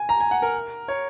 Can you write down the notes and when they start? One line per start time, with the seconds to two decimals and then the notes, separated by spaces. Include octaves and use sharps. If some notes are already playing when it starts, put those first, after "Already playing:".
Already playing: G#5
0.09 A#5
0.20 G#5
0.31 F#5
0.42 A#4
0.88 C#5